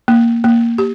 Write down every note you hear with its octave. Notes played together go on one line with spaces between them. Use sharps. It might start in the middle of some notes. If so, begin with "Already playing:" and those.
A#3
A#3
G4